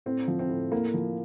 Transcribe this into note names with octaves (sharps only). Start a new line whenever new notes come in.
A2 C4
F3
C4
A2
A2 A#3
F3